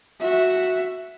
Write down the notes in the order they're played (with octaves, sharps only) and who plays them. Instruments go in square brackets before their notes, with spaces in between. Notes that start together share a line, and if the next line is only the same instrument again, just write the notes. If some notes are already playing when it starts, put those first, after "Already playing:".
[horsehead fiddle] F#4 E5